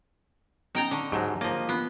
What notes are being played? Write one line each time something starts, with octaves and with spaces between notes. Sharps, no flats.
B3 C#4 D#4 G5 A#5
D3 C#6 D6
G#2 F#3 G4 C5 A5
F3 A#3 C#5 D#5
B3 C4 D4 F4